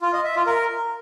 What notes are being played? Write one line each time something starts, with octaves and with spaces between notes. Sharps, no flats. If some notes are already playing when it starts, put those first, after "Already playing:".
F4
D#5
E5
F4
A#4